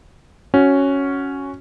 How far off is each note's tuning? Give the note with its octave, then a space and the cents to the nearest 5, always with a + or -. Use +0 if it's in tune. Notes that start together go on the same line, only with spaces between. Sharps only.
C#4 +0 F#4 +0